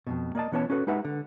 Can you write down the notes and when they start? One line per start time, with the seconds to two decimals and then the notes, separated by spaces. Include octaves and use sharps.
0.07 F2 G#2 B2
0.35 A#3 D5 D#5 A5
0.52 B2 E3 B3 C#4 C#5 A5
0.70 C#4 F#4 A4 B4
0.87 G#3 D#4 G4 B4 E5 F#5
1.05 D3